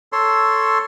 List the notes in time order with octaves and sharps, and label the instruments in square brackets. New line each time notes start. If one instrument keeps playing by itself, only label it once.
[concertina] A4 C#5 C6